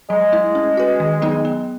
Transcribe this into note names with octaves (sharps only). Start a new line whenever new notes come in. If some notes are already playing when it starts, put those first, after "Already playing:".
F#3 G#3
A3 E4
C#4
F#4 B4
D#3
F#3 B3 D#4 G#4
B3